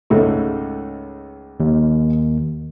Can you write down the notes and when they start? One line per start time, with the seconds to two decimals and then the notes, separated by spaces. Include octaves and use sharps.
0.10 C#2 G#2 A3
1.60 D#2